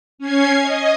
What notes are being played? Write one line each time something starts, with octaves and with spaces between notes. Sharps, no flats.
C#4 G#6 C7
D#5